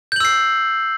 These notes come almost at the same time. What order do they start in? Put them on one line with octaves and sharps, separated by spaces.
G6 F#7 E6 C7